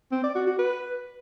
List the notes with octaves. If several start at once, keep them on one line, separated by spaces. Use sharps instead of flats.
C4
D5
F#4
F#4
B4